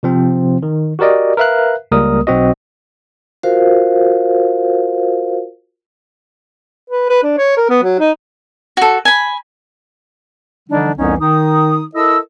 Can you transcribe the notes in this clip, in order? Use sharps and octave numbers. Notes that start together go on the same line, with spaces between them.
C3 F3 C4
D#3
F#4 G4 A#4 D5 D#5
A#4 B4 E5 F5 F#6
C#2 G3 A#3 A#4 D#6
B1 C4 F#4 D#5
F4 F#4 A#4 C5 F5
B4
B4
D4
C#5
A#4
B3
F#3
D#4
F#4 A4
G#5 B5
D3 E3 F3 G3 D4 D#4
C2 F2 E3 B3 C#4 D#4
D#3 D#4 D#6
E4 A4 A#4 D#5 E6